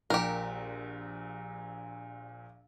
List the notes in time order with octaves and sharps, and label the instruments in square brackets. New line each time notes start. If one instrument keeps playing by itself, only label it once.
[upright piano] A#1 A#2 [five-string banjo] G4 A#4